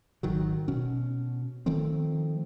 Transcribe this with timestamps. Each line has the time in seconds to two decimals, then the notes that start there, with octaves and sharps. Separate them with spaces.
0.23 G#1 D#3 F#3
0.68 B2 C#4
1.66 D#3 F3 A3 C4